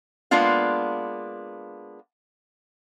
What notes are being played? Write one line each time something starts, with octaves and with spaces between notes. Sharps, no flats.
G#3 A#3 B3 D4 F4 F5